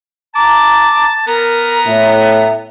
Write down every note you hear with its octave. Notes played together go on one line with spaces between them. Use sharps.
A5 A#5 D6
B3 A#4 A#5
A2 E5